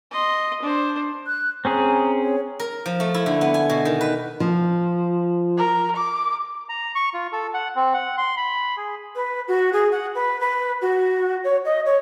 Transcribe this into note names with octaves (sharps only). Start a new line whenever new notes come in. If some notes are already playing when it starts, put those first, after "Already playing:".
D#5 C6
D4 C5
F#6
C4 C#4 G#4 A#5
C#5
A#4
F3
A3
E4
D3
B3
G#5
B2
D#3
B4
F3
A#4
D6
A#5
C#6
F4
A4
F#5
C4
F#5
C6
B5
G#4
B4
F#4
G#4
F#5
B4
B4
F#4
C#5
D#5
C#5